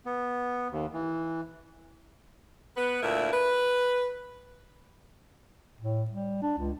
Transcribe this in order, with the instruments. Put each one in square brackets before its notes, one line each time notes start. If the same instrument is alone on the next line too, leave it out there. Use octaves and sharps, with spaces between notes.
[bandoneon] B3
D#2
E3
[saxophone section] B3 B4
D2 A#2 E4 A#4 E5
B4
[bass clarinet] A2
G3
D4
C#2